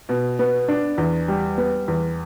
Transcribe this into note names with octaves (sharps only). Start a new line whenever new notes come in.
B2
B3
D4
E2
G3
B3
E2